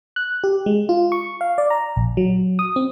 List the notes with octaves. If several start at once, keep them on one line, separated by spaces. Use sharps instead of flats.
F#6
G4
G#3
F4
C#6
F5
D5
A#5
A#1
F#3
D#6
C4